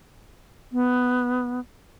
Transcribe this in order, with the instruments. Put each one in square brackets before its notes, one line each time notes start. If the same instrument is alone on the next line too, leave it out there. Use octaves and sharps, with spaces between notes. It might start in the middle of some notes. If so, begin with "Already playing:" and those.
[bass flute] B3